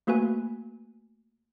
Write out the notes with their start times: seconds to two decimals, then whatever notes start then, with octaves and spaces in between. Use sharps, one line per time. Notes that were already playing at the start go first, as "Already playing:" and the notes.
0.07 A3 A#3 F#4 B4 G#5